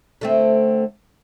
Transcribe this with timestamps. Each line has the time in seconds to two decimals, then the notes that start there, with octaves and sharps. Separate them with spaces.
0.21 D3 A3 C4